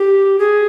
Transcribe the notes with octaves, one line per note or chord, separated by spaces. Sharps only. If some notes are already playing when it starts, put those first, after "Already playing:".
Already playing: G4
G#4